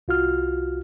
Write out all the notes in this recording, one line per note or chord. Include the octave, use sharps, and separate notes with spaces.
C2 F4 F#4 F6